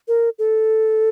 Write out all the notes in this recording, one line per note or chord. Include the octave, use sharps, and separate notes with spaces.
A#4
A4